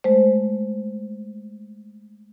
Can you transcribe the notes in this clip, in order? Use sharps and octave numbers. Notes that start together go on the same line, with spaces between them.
G#3 A3 C5